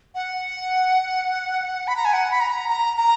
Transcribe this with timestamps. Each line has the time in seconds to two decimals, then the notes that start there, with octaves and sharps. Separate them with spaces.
0.15 F#5
1.88 B5
1.97 A#5
2.05 G#5
2.14 F#5
2.31 B5
2.41 A#5
2.69 A#5
2.97 A#5